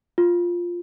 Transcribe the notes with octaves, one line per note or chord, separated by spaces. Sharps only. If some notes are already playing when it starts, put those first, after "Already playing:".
F4